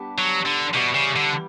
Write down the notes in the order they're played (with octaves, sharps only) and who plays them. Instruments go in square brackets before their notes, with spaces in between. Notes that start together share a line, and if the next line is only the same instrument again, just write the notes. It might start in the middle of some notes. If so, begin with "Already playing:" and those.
Already playing: [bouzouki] G3 B3 D4 G4
[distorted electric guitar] F#3
D3
[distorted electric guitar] B2 [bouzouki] E3 G3 B3
[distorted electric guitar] C#3
D3